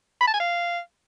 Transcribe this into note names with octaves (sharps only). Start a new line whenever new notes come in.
B5
A5
G#5
F5